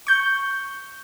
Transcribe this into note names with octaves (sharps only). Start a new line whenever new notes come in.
C#6 G6